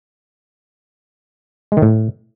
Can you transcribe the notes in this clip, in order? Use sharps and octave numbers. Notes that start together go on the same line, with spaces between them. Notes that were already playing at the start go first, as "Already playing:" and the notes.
G#3
D#3
A2